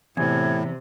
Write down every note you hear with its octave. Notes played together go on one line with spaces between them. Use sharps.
E2 A2 C3 G#6